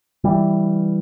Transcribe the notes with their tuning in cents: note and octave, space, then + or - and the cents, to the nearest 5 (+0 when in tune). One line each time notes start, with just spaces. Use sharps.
E3 +0 G3 +0